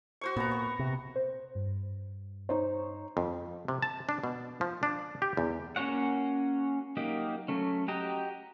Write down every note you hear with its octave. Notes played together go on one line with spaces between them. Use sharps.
F#4 C5 C#6
A#2 B3 A#5
C#6
C3
C5
G2
D#4 C5 C#5
F2
C3
A5
D4
B2
F3
D4
G4
E2
A#3 C#4 F#4 C#5 F#5
F#3 A#3 D#4 G4
F#3 A3 C#4
F#4 G4 D#5 G5 A#5